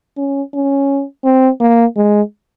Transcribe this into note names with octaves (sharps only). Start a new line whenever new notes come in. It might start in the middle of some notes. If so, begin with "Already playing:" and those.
C#4
C#4
C4
A#3
G#3